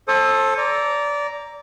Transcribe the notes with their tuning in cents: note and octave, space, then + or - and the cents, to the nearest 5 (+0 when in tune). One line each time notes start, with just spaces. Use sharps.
A4 +0 C5 +35 D#6 -15
D5 -20 A#5 +0